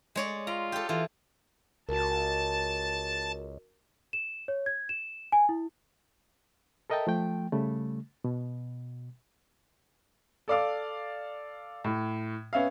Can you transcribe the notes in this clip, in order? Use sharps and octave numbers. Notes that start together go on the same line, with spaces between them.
G#3 C#5 D5
F4 A#5
G4 A4
E3 F4
C#2 F#4 A#4 A5
E7
C#5
G#6
E7
G#5
E4
A4 A#4 D#5 E5 G5 A5
F3 A3 G5
C#3 G3 A3
B2
A4 D5 F5 D6
A2
B3 C#4 E5 F5